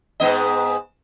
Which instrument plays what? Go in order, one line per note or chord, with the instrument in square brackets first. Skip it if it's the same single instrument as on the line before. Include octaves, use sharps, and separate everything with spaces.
[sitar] G#2 B3 D#5